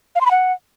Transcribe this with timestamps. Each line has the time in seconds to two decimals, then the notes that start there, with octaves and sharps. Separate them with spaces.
0.15 F5
0.21 C6
0.26 B5
0.31 F#5